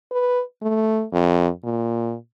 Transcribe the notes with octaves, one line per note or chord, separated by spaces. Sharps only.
B4
A3
F2
A#2